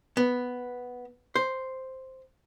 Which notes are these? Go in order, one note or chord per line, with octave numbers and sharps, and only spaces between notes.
B3
C5